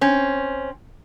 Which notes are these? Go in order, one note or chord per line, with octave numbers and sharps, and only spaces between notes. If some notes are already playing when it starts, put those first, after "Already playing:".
C4 C#4